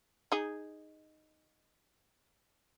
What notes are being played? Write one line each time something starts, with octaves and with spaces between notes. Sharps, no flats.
D#4 G#4